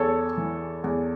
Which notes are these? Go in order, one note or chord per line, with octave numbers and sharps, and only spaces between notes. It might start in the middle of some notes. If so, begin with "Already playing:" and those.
Already playing: E2 A4 C#5
E3
E2